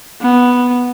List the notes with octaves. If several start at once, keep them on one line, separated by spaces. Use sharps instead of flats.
B3